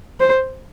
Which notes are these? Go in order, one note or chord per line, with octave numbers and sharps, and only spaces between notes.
C5